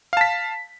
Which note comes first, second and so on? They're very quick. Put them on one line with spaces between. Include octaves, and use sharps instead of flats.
F5 A5 B6